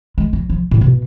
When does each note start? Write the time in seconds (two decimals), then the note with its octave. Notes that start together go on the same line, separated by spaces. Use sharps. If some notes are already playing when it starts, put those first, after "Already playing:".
0.18 G#3
0.33 F#3
0.50 F3
0.71 A2
0.81 B2